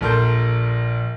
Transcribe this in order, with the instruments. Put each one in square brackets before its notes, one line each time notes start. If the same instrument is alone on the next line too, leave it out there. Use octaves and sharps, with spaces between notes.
[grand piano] A#1 A4 A#4 A5 C6 G6